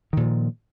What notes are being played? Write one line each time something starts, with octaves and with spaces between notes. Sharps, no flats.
A#2 D#3 F3